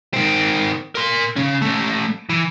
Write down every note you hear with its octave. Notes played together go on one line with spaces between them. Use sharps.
D#3 C4
A#4 C6
C#3 C#4
A3 C#4
E3